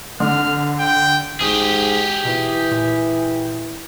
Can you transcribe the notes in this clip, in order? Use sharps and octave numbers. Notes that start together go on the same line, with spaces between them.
D3 F6
G5
A1 G#2 G4 G#4
B2 E3
A#2